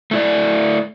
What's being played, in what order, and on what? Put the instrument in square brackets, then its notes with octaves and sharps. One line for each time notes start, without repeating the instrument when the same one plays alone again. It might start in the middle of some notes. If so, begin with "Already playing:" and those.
[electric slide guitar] A3 E4 D5